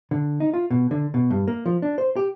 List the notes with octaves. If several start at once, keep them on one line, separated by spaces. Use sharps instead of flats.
D3
D#4
F4
B2
D3
B2
G2
A#3
F3
D4
C5
G4